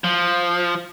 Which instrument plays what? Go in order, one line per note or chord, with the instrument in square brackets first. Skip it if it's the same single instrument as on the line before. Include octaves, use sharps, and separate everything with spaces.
[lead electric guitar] F3